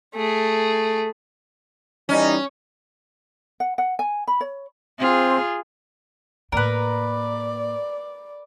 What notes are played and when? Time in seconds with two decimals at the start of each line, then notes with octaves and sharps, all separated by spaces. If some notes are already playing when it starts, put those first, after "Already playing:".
0.15 A3 G#4
2.09 E3 G3 C#4 D#4
3.60 F#5
3.78 F#5
3.99 G#5
4.27 B5
4.41 C#5
4.99 C4 F4 G#4
6.52 A2 A#3 A#4 B4 D5